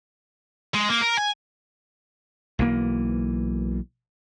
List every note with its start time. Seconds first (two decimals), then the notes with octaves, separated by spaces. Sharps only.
0.74 G#3
0.89 A#3
1.02 A#4
1.17 G#5
2.59 B1 E3 A#3